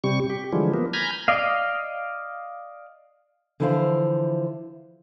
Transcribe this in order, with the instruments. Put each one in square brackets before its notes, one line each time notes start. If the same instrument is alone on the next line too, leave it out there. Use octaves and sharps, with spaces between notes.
[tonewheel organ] C3 G3 C#6
G4
D3 E3 F3 G3 G#3
F3 A#3 B3
G#5 A#5 B5 F6 G6 G#6
[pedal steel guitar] D5 D#5 F5
[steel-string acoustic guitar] D3 E3 F3 E4 C5 F5